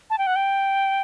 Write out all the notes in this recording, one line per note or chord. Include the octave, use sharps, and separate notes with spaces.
A5
G5
F#5
G5